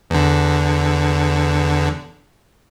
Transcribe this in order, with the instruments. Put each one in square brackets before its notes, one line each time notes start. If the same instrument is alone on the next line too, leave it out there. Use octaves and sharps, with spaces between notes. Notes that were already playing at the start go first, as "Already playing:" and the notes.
[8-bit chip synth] E2 D3